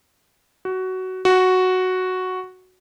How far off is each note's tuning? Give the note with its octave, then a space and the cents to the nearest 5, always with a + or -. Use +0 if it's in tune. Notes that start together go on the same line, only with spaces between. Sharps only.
F#4 +15
F#4 +0